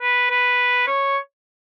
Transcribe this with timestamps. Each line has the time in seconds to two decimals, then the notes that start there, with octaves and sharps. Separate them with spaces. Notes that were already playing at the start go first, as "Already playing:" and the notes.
0.01 B4
0.31 B4
0.87 C#5